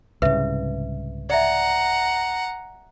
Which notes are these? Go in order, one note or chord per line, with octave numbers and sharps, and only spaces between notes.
C2 G#2 C#3 B4 E5
D5 E5 F#5 A#5